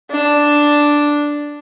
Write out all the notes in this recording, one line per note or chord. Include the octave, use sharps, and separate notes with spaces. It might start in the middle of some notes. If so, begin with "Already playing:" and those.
D4